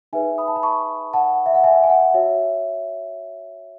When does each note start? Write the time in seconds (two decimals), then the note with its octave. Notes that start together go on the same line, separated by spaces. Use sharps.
0.13 D#4 G#4 B4 E5 G#5
0.38 B5 D#6
0.48 A5
0.56 B5
0.63 A5 C#6
1.13 F#5 A5
1.46 E5
1.54 F#5
1.64 E5 G#5
1.84 G#5
1.89 F#5
2.14 F#4 C#5 E5